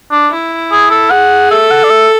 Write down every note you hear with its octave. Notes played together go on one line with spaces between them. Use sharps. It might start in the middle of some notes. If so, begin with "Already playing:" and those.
D4
E4
G#4
A4
G#4 F#5
A4 E5
F#5
D5
E5